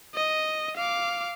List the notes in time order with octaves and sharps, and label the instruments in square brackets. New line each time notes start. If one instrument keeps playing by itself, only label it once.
[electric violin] D#5
F5 D6